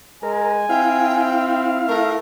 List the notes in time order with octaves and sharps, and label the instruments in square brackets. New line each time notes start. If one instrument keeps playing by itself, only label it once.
[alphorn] G#3 [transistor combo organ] A#4 [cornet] G#5
[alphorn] C4 [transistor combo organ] E4 F5 [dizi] G5
[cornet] A3 [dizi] A#4